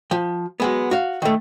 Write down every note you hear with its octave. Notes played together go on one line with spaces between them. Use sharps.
F3 G5
F#3 G#3 B3
F#4 F5
D#3 A3